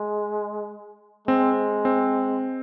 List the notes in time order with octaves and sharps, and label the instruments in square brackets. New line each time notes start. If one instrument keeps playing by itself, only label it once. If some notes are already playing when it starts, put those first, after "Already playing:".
Already playing: [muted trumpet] G#3
[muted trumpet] G#3 [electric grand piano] C4
[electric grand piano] C4